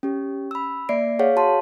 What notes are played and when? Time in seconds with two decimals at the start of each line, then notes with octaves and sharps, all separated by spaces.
0.03 C#4 G4
0.51 B5 E6
0.89 A#3 D5 E5 C7 D7
1.19 G#4 C#5 F5 F#5
1.36 F#4 A5 C6